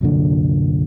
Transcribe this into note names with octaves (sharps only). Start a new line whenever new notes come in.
C2 F#2 A#2 D3